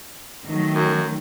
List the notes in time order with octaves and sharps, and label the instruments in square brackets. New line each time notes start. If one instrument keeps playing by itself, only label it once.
[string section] D#3 F#3 A3
[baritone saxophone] F#2